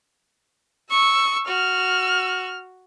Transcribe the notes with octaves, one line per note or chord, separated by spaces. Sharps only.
C#6 E6
F#4 F6